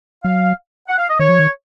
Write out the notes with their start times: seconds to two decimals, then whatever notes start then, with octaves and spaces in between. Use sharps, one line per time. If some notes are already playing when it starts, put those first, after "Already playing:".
0.24 F#3 F5
0.88 F#5
0.98 F5
1.09 D#5
1.19 D#3 C#5
1.29 F3
1.39 D#3